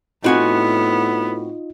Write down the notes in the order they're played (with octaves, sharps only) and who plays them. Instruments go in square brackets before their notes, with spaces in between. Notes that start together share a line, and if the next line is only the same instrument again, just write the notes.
[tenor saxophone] A2 [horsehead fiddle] B3 [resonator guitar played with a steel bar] C4 F#4 G#5 [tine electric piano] D#4 F4 D#5